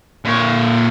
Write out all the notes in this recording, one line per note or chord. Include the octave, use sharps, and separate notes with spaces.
A#2 C#5